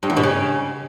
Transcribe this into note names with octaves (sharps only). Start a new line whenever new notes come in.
G2
E2
B2
C#3